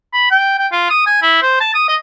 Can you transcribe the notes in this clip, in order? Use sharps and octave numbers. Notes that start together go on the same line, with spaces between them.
B5
G5
G5
F4
D#6
G#5
E4
C5
A5
D#6
D#5